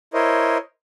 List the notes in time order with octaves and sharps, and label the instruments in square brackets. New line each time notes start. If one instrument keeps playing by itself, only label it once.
[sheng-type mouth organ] E4 A#4 C5 C#5 D#5